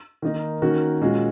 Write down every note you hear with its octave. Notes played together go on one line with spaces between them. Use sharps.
D#3 A#3 D#4
D#3 A#3 C#4 F#4
A#2 G#3 C#4 F#4